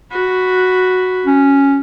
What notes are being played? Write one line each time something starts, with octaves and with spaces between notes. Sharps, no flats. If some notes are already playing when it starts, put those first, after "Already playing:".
F#4 B5
C#4